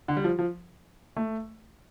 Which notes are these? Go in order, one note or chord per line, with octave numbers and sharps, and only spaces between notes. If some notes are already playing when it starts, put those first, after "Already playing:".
D3
G3
F3
F3
A3